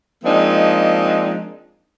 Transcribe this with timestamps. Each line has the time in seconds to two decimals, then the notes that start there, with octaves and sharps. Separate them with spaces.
0.24 F3 G#3 A#3 C4 D4 D#4